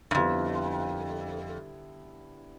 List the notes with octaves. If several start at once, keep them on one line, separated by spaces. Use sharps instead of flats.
G2
F2 D3 G3 B3 E4